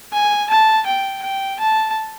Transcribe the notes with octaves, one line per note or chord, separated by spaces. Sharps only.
G#5
A5
G5
G5
A5